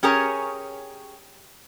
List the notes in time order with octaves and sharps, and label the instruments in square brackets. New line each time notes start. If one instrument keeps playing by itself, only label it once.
[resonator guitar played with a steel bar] C#4 G4 G#4 A#4 C#5